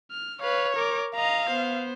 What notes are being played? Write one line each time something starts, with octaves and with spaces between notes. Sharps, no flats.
F6
B4 C#5 F5
A#4 D6
D#5 F5 A#5
B3 C5